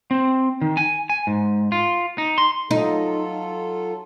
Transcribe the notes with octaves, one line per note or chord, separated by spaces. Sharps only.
C4
D#3
G#5
G#5
G#2
F4
D#4
C6
F#3 D#4 F4 A4